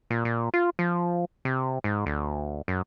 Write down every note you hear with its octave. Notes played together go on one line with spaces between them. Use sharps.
A#2
A#2
F4
F3
C3
G#2
D2
F#2